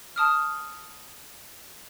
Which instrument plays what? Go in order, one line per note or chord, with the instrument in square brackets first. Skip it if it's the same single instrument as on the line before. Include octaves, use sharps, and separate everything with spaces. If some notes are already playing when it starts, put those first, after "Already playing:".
[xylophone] A5 D#6 F6